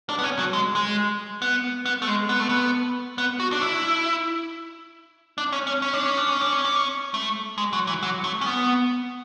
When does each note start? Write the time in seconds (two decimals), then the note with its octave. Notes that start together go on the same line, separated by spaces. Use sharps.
0.09 D4
0.19 B3
0.24 C#4
0.39 F#3
0.53 G#3
0.75 G#3
1.42 B3
1.86 B3
2.02 A3
2.07 G#3
2.29 B3
2.40 A3
2.49 B3
3.18 B3
3.40 F#4
3.52 D4
3.62 E4
5.38 D4
5.52 C#4
5.67 C#4
5.82 C#4
5.93 D4
6.05 C#4
6.17 D4
6.29 C#4
6.41 D4
6.52 C#4
6.65 D4
6.76 C#4
7.14 A3
7.58 G#3
7.73 F#3
7.87 E3
8.03 F#3
8.24 A3
8.41 C#4
8.46 B3